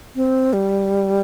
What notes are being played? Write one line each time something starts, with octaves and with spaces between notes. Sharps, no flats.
C4
G3